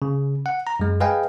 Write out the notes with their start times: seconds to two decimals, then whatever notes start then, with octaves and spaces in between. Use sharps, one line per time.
0.02 C#3
0.46 F#5
0.67 A#5
0.80 F#2 G#3
1.00 G#4 B4 D#5 F5 G5 G#5